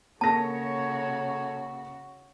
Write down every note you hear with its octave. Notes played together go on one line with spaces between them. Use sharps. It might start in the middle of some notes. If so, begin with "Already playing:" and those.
C#3 A#3 F#4 G#4 A4 C#5 A5 A#6